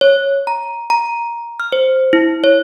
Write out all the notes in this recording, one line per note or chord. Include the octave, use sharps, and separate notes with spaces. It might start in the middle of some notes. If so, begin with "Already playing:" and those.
C#5
A#5
A#5
F6
C5
E4
C#5